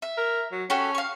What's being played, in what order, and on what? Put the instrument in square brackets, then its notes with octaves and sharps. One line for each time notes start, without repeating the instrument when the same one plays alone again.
[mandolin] E5
[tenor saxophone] A#4
F#3
[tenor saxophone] C#4 [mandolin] F#4 G4 A4
[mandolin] F5 C#6